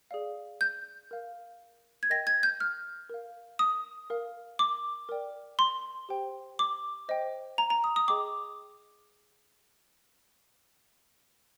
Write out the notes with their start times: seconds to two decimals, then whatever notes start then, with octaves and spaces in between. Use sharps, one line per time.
0.11 G#4 D5 F5
0.61 G6
1.11 A#4 F5
2.03 G#6
2.10 A#4 D#5 G5 A#6
2.27 G#6
2.43 G6
2.60 F6
3.09 A#4 F5
3.59 D#6
4.10 A#4 F5
4.59 D6
5.09 A#4 D5 G5
5.59 C6
6.09 G4 C5 G5
6.59 D6
7.09 C5 D#5 G5
7.58 A#5
7.70 A#5
7.84 D#6
7.96 D#6
8.08 G#4 D#5 G5 D6